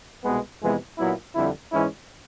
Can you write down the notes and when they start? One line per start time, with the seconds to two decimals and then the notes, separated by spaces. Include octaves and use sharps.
0.24 C2 B2 G#3 B3
0.61 F2 C3 E3 G#3 B3
0.98 A#2 F#3 B3 E4
1.35 F2 D3 G3 C4 E4
1.73 G#2 E3 G#3 C#4 E4